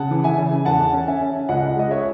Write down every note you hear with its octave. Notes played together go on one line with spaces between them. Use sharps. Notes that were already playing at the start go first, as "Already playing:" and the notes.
Already playing: C#3 F#5 A5
E3
E5 G#5
C#3
E2 F#5 A5
C#4
E5 G#5
C#4
C#2 D#5 F#5
G#3 D#5
C#5 E5